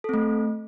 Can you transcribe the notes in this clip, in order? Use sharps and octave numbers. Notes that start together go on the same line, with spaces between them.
A3 C4 A4